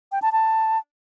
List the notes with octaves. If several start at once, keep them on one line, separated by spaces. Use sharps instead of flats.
G5
A5
A5